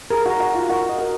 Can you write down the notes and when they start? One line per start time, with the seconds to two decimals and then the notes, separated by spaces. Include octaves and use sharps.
0.10 G#4 A#4
0.25 F#4 A#5
0.40 F#4
0.50 F4 A#5
0.69 F#4 A#4
0.89 D#5
0.99 A#4